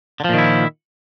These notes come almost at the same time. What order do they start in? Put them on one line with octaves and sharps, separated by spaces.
D3 F3 A#2 D#3 E4